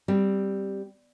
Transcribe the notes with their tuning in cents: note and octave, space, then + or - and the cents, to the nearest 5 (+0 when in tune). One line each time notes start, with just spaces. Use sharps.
G3 +0 C4 +0